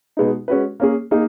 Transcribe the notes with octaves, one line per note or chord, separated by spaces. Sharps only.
B2 G#3 B3 D#4
G#3 C#4 F#4 B4
A#3 C#4 G#4
A#3 D#4 G#4